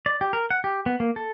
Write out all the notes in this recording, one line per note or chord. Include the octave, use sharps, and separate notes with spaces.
D5
G4
A#4
F#5
G4
B3
A#3
A4